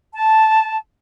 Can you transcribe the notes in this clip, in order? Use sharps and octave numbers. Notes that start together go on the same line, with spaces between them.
A5